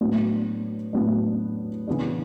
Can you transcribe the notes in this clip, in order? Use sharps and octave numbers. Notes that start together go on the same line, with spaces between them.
A2 F#3 B3 D4
A2 F#3 B3 D4
C#3 E3 B3 D4